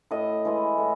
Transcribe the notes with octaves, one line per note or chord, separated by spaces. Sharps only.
A2 D#5
E3 G#3
A2